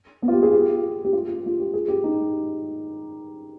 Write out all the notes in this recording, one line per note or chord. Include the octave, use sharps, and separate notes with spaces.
B3
F4
G4
G#4
G4
G4
F4
F4
F4
G4
G#4
G4
D#4